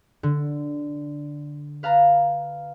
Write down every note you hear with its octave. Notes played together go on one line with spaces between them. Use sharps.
D3
B4 F5 A5 A#5